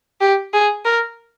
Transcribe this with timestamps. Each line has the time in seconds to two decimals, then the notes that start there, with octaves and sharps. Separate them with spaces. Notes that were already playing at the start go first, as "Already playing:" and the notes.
0.21 G4
0.53 G#4
0.85 A#4